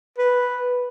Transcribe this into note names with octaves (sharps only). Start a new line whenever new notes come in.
B4